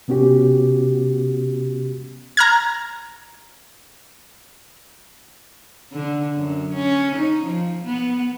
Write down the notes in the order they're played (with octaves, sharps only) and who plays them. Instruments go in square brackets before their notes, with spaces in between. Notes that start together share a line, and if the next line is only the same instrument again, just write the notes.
[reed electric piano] C3 B3 C#4 F#4 G4
[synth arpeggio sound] A#5 F6 G#6
[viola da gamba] D3
F#2
C#4
D#4
F3
B3